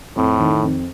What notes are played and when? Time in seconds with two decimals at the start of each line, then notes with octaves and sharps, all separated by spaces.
0.16 F2 A2
0.39 D#3
0.63 F2